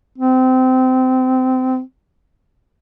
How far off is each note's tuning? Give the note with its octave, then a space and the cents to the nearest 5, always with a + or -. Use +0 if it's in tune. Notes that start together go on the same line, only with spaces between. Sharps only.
C4 -25